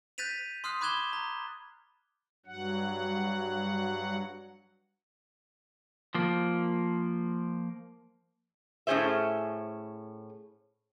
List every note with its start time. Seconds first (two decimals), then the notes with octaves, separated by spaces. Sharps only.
0.18 F#6 G6 A6 B6 D#7 F7
0.64 C6 D#6 F6 F#6 C7
0.81 B5 D6 F#6 G#6 E7 G7
1.13 A#5
2.46 G2 F#3 F#5
6.15 F3 A#3
8.87 A2 C#4 F#4 G#4 C5 E5